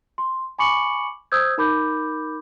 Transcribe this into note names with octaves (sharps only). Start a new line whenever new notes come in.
C6
G#5 B5 C#6 D6 C#7 F#7
C5 D#6 E6 G6 G#6
D#4 A#4 B5 D6 G6